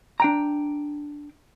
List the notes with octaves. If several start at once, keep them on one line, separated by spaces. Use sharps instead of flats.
D4 G5 A#5